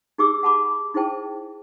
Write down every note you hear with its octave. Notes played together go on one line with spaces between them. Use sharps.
D#4 G4 G#4 D6 E6
F#5 A5 B5 D6
D#4 E4 G#4 C5 G5 A5